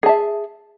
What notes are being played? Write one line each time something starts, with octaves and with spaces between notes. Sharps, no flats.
G#4 E5 A5